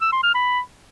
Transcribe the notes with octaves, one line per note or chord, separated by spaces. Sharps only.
E6
C6
F6
B5